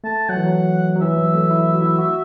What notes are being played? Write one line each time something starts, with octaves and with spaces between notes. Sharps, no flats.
A3 A5
F#3 F#5
E3
F#3
F#3
E3 E5
F#3
A3
E4
F#4
E4
F#4